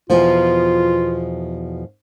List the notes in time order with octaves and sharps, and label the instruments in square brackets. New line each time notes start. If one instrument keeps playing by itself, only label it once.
[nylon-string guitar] E2 B2 F3 [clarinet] F4